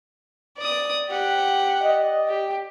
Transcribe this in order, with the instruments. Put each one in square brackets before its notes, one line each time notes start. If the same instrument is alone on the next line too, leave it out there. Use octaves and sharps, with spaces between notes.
[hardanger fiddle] D5 D#6
G4 F#5
[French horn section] D5 D#5
[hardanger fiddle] G4